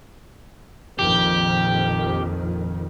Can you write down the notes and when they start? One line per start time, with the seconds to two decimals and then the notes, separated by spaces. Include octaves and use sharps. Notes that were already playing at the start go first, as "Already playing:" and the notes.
0.99 A#1 F2 D#3 G4